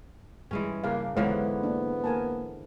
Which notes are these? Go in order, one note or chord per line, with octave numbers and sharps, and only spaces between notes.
G2 E3 G3 G#3 C#4
C#3 A#3 D4 F5
B1 G#2 D3 E3 G#3 B3 C#5 F5
A#3 D4
A#3 A#4 G#5 A5